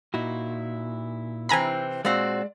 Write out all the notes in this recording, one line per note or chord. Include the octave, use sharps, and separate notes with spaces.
A#2 D#4 E4 F#4
C3 E3 C4 G#5 A#5 B5
A#2 G#3 C4 F#4 D5